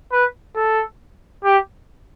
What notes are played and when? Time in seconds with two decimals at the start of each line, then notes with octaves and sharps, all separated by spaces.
0.12 B4
0.56 A4
1.44 G4